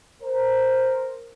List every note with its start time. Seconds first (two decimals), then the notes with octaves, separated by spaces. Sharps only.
0.22 A#4 C5